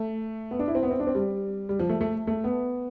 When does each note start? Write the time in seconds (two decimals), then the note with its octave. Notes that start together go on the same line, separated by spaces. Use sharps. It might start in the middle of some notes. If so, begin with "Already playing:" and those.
Already playing: A3
0.51 B3
0.59 D4
0.68 E4
0.75 C4
0.83 B3
0.91 C4
1.00 D4
1.07 C4
1.15 G3
1.69 G3
1.79 F3
1.89 A3
2.01 A3
2.27 A3
2.44 B3